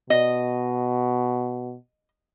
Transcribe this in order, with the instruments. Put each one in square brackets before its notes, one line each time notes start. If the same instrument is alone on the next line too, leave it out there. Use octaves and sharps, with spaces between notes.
[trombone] B2 [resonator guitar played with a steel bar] D#5